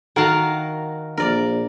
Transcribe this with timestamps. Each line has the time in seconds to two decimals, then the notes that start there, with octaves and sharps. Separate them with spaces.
0.16 D#3 F#4 A#4 F5 F#5 A5
1.17 A#1 A#4 D5